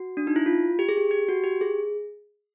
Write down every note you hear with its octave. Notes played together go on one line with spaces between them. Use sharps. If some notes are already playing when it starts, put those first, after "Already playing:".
Already playing: F#4
D4
D#4
E4
F4
G4
G#4
G4
G4
F#4
G4
G#4